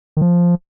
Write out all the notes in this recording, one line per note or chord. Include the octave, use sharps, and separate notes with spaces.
D#3
F3